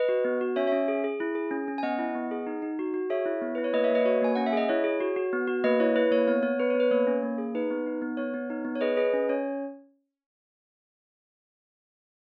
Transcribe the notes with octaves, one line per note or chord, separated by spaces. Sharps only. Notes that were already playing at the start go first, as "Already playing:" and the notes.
Already playing: B4 D#5
F#4
B3
F#4
C#4 C#5 E5
C#5 E5
C#4
G#4
G#4
E4
G#4
C#4
C#4
G#5
B3 D#5 F#5
E4
B3
G#4
D#4
D#4
F#4
F#4
G#4 C#5 E5
E4
B3
E4 B4
C#5
A#3 B4 D#5
C#5 E5
A#3
B4 D#5
F#4 C#5
A#3 G#5
C#4 F#5
E5
G#4 D#5
E4 C#5
G#4
F#4
F#4
B3
F#4
A#3 B4 D#5
E4 C#5
E4 B4
A#3 C#5
B3 C#5
B3 C#5
B3 B4
C#5
B3
B4
A#3 C#5
C#4
A#3
G#4
D#4 B4
B3
D#4
B3
B3 C#5
B3
D#4
B3
C#5
G#4 B4 D#5
G#4 B4 D#5
C#4
C#4 C#5